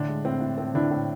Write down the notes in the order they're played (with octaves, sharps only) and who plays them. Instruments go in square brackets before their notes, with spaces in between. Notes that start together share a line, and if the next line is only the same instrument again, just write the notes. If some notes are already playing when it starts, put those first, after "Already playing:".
Already playing: [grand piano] A2 [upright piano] D3 D4
[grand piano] G#3
[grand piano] A2 [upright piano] C4
[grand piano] A2
[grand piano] A2 [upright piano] C4
[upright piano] D3 D4 [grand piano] E4
[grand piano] A2